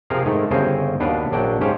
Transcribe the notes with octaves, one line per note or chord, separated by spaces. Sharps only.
C3 F3 G#4 A#4 F5
G#2 D#3 A3
G1 C#3 C4 A#4 C5 G#5
D#2 B2 D4 B4 F5
A#1 F#3 D4 D5 G5
G#2 C#4 G4 C5 F5